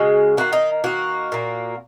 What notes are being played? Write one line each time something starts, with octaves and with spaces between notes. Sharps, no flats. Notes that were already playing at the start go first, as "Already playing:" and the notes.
Already playing: C#3 G#3 F#4
D#3 A#3 F#4
D#4
D#3 A#3 F#4
A#2 A#3